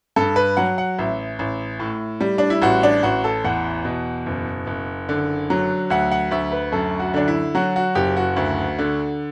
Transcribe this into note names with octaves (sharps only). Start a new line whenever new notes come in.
G2 A4
B4
F#3 F#5
F#5
A1 E5
A1
A2
G3
D4
E4
A1 F#4
D4
A1 F#4
A4
E2 F#5
B2
F#1
F#1
D3
F#3
D2 F#5
F#5
D2 E5
B4
F#2 A4
F#4
D3 D4
E4
F#3 F#4
F#4
F#1 G4
F#4
D2
D3